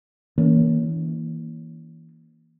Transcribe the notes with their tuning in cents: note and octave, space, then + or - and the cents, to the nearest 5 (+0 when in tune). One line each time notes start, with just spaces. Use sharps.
E3 -25 A#3 +0 C#4 +20